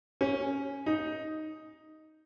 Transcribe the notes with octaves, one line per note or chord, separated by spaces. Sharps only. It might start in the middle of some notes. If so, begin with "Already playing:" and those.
C#4
D#4